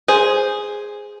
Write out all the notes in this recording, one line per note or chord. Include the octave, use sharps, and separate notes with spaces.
G#4 C5